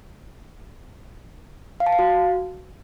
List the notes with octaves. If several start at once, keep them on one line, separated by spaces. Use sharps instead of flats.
F5
A5
F5
F#4